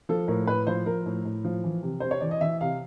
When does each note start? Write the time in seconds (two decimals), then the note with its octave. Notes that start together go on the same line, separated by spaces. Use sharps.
0.09 F3 A4
0.28 A2 A#4
0.47 A2 B4
0.67 F3 C5
0.86 F3 A#4
1.06 A2
1.25 A2
1.44 F3
1.64 E3
1.83 C3
2.00 C3 C5
2.11 C#5
2.21 E3 D5
2.31 D#5
2.41 E3 E5
2.61 C3 F5